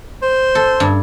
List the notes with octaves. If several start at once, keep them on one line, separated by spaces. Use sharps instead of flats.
C5
A4
G2